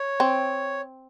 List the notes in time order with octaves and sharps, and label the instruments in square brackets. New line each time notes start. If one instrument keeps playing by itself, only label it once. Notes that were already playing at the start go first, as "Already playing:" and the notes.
Already playing: [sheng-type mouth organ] C#5
[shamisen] C4